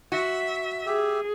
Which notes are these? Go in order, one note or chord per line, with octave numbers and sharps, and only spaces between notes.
F#4 E5
G4 G#4 E5